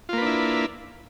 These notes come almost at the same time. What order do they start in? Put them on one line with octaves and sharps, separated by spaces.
F4 A#3 B4 D4 E4